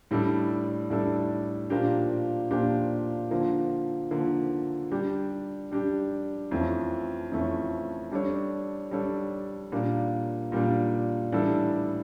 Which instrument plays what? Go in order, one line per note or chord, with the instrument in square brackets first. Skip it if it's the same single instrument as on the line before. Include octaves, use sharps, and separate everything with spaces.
[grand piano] A2 G3 D4 A4
A2 G3 D4 A4
A#2 F3 A#3 D4 G4
A#2 F3 A#3 D4 G4
D3 F3 A#3
D3 F3 A#3
G3 D4 G4
G3 D4 G4
F2 E3 A3 C#4
F2 E3 A3 C#4
G3 D4 A4 C#5
G3 D4 A4 C#5
A#2 G3 A#3 D4
A#2 G3 A#3 D4
A2 E3 G3 D4 A4